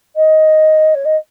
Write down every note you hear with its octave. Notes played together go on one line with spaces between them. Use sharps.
D#5
C#5
D#5